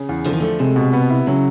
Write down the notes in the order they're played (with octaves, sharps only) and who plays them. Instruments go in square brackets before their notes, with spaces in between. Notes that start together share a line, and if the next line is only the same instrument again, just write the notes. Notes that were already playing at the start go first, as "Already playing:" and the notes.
Already playing: [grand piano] C#3
E2
[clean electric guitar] D3 [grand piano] F3
[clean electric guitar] D#3
[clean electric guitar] D3 [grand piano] A3
[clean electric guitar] C3 [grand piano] G#3
[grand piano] B2
B3
E4
[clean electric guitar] C#3 [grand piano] F#3